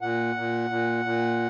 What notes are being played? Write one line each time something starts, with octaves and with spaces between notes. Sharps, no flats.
A#2 F#5
A#2
A#2
A#2